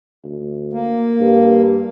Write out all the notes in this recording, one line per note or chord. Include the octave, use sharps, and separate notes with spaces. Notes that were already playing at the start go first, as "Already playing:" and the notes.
D2
A#3
G2